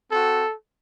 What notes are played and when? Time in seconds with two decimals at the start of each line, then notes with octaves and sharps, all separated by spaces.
0.11 C4 F#4 A4